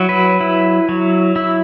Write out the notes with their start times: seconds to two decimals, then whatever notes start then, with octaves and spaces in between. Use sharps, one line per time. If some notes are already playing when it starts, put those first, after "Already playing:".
Already playing: F#3 E4
0.09 B4
0.41 E4
0.89 F#3
1.36 E4